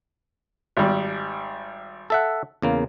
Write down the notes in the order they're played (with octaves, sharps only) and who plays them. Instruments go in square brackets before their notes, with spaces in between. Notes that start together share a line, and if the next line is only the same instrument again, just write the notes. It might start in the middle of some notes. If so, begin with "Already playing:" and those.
[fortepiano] G#1 G3
[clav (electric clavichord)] A4 E5 F#5
E2 C#3 A#3